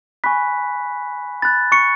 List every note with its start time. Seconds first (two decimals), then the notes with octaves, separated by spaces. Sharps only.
0.24 G#5 B5 C#6 F#6 B6
1.42 B5 F#6 A6
1.72 C#6 C#7